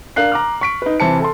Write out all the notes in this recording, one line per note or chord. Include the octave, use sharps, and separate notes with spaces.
D4 A#4 F5 F#6 C7
A#5 D6 F6
C#6 B6 D7
D#4 B4
C3 E3 C5 A5 C#7
A4 A5 C6